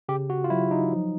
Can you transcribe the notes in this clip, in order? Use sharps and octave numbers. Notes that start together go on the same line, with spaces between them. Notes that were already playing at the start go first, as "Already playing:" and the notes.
C#3 G4
F#4
F4
F#3 E4
D#4
F3